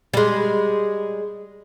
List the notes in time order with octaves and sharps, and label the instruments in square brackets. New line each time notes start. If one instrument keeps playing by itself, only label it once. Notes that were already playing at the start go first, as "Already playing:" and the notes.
[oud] G3 G#3